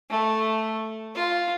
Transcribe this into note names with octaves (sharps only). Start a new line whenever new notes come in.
A3
F4